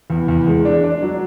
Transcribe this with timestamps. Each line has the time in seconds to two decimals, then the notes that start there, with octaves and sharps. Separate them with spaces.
0.10 E2
0.28 E2
0.46 G#3
0.65 D4
0.84 D4
1.02 F#3